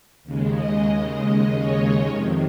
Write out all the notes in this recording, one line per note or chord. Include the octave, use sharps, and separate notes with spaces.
D#2 C#3 G#3
D#5
D#5
C#5
F2 C3 D#3 C#5